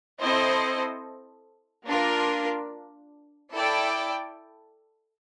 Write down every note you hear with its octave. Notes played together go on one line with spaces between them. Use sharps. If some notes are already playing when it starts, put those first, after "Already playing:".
C4 E4 A4 C5 D#5
A#3 D4 F4 A#4
E4 A4 D5 G5